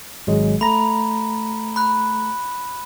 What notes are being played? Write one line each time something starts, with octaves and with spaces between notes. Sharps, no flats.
G#1 F#3 G#3
A3 A#5 B5
B5 F#6